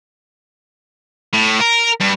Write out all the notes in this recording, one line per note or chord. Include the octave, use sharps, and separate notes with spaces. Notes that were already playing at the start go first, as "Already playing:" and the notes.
A2
A#4
G2